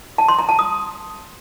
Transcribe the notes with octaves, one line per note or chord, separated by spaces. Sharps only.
A5
C6
A#5
A5
D#6